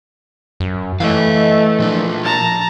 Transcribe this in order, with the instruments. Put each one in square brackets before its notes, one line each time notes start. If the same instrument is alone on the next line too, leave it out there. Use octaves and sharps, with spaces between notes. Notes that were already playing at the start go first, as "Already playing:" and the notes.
[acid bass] F#2
[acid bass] E3 [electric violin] A3 [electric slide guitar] D#5 F5
[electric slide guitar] A#2 F3 D4
[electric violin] A5 A#5